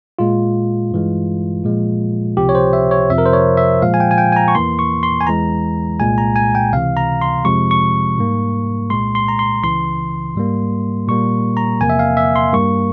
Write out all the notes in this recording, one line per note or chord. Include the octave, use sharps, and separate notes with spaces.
A#2 G#3 F4
G2 E3 G#3
A#2 F3 G#3
C#2 C3 F3 G4
C#5
C5
E5
C#5
F2 C3 F3 E5
A#4
C5
C#5
E5
A#2 F3 G#3 F5
G#5
G5
G#5
G5
G#5
A#5
C#6
E2 E3 A#3 C6
C#6
C6
G#5
E2 E3 G#3 A#5
C2 A#2 G#3 G#5
A#5
G#5
G5
C#2 C3 E3 F5
A#5
C6
F2 C3 F3 G#3 C#6
C#6
G#2 G3 A#3
C2 A#2 G#3 C6
C6
A#5
C6
C#2 C#3 E3 C6
G#2 G3 A#3
A#2 G3 A#3 C#6
A#5
E2 C3 F3 A#3 G#5
E5
F5
E5
C6
G2 G3 A#3 C#6